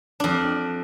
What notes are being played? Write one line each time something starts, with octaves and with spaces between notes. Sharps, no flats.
F2 D4